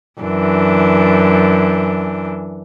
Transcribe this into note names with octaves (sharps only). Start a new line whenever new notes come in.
F#2 E3 D4